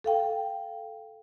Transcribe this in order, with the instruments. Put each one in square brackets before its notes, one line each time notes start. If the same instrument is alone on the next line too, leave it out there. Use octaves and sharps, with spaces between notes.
[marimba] A4 F5 G5